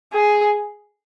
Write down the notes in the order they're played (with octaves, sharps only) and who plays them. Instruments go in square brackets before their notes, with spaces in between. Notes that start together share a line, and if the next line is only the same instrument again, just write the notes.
[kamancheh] G#4